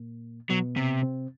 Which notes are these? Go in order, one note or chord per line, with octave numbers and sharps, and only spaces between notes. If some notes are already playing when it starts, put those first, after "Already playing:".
Already playing: A#2 A#3
B2 F#3 B3
C3
C3 C4